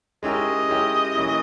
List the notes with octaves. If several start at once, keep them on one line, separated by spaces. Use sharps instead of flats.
G#3 C#4 E4 G4 A#4 D#5
G#3 C#4 E4 G4 A#4
E3 A#3 C#4 E4